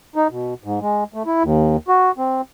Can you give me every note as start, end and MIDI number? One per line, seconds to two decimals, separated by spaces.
0.16 0.28 63
0.31 0.54 47
0.64 0.79 44
0.81 1.04 56
1.14 1.23 57
1.26 1.43 64
1.43 1.77 39
1.88 2.12 66
2.18 2.41 60